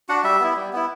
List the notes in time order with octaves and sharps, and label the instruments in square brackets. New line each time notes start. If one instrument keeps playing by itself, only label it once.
[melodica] D4 F#4 F#5
G3 E5
B3 E4
G3
B3 E4